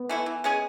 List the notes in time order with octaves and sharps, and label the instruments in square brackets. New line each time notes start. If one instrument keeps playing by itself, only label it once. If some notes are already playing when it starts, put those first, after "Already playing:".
Already playing: [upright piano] B3
[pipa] E3 A3 E4
E3
G#3 C#4 G#4